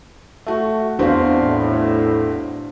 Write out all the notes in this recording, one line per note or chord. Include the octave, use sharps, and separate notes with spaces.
A3 F#4
E2 C4 D4 F#4 C5 F5
A2